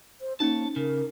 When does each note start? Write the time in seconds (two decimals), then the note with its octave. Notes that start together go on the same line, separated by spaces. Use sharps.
0.21 C5
0.40 A#3 C#4 D#4 C#5 A5
0.76 C#3 A#4